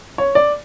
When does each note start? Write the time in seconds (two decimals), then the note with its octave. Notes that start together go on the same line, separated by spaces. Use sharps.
0.18 C#5
0.35 D5